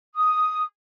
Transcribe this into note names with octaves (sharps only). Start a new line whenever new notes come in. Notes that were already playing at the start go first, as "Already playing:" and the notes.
D#6